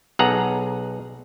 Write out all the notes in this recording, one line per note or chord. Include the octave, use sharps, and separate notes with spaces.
B1 G#4 F#5 A#5